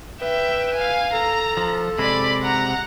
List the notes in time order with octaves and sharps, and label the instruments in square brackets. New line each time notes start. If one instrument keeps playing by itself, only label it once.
[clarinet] B4 [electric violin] E5 G5
[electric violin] F5 G#5
[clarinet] A4 [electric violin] A#5
[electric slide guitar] F3
[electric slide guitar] C3 G#3 [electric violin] D5 B5
[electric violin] F#5 A#5